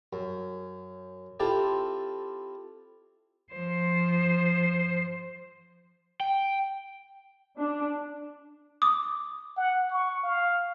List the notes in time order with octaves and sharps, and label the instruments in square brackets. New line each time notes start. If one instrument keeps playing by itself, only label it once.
[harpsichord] F#2
C4 E4 F4 G4 A4 D5
[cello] F3 C5
[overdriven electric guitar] G5
[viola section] D4
[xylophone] D6 D#6
[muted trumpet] F#5
C#6
F5